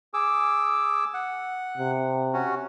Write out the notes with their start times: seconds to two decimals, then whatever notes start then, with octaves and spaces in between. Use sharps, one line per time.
0.14 G#4 D6 E6
1.14 F#5
1.78 C3
2.34 C#4 F#4